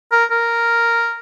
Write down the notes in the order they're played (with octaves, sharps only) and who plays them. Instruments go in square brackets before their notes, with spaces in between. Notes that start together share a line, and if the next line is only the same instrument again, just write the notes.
[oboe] A#4
A#4